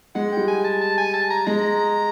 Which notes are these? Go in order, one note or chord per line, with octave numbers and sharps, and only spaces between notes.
G#3 F#5
G3 G5
G#5
A5
A5
G#5
A5
A#5
G#3 A#5